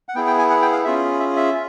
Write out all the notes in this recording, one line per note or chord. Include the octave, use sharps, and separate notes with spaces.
F#5
B3 E4 G#4 G5
G5
G#5
F#5
G5
F5
C#4 F4 G#4 E5
E5
E5
F4